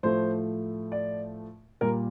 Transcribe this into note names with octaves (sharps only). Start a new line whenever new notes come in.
A2 F3 A3 C5
D5
A#2 G3 A#4